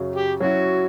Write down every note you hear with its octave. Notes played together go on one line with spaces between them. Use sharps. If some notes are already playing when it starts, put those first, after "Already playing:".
Already playing: F#2 C#3 F#3
G4
F#3 C#4 E4 F#4